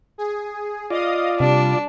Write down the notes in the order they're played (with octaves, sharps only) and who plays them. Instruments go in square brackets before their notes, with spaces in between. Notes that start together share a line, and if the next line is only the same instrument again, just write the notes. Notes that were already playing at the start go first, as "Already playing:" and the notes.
[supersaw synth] G#4
[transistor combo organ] F4 D5 [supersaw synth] D#5 F5 D#6
[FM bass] C3 [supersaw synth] G3 [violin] D4